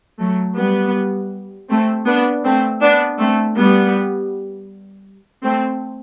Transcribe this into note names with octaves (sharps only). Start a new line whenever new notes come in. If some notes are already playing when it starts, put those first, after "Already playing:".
F#3 A3
G3 B3
A3 C4
B3 D4
A3 C4
B3 D4
A3 C4
G3 B3
A3 C4